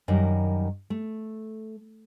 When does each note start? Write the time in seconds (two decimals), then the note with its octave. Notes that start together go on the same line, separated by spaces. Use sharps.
0.08 F#2 D#3 G3 A#4
0.90 A3